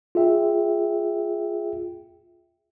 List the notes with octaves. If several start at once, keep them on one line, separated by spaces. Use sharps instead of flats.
F4 G#4 E5 G5